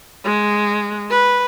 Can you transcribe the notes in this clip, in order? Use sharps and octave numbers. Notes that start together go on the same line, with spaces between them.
G#3
B4